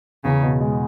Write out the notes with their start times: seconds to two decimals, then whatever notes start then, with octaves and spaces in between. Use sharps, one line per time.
0.25 E2 C#3
0.43 B2
0.61 G#3